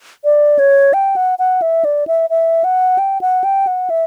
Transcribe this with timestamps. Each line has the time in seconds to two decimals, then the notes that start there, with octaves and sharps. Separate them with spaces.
0.24 D5
0.59 C#5
0.94 G5
1.16 F#5
1.39 F#5
1.62 E5
1.85 D5
2.07 E5
2.30 E5
2.64 F#5
2.98 G5
3.21 F#5
3.44 G5
3.67 F#5
3.90 E5